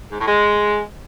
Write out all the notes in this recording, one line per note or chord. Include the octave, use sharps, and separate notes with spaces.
G#2
A2
G#3